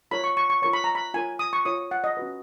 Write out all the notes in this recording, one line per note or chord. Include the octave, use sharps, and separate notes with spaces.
F4 A#4 C#5 B5
C#6
C#6
C#6
F4 A#4 C#5 C#6
B5
A#5
B5
F4 A#4 C#5 G#5
D#6
C#6
F4 A#4 C#5 D#6
F#5
D#5
C#4 F#4 B4